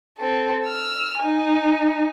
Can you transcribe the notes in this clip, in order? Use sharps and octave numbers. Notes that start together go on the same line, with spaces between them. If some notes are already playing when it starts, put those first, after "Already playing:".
C4 A4
E6 F6
D#4 G#5